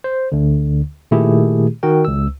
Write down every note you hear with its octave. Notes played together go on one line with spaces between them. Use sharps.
C5
D2 D3
A#2 D#3 A3 E4 G4 G#4
D#3 F#4 A#4 G5
C#2 E6